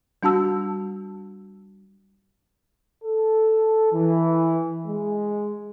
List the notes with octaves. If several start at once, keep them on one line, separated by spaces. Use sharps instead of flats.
G3 D4 F#4 A5 E6
A4
E3
G#3